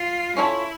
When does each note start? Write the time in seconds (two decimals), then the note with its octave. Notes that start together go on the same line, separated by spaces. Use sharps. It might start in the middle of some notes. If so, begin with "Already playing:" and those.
Already playing: F4
0.36 C#4 E4 F4 A4 C#5